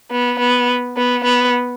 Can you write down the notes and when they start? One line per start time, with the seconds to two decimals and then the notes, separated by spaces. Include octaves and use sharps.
0.11 B3
0.39 B3
0.97 B3
1.24 B3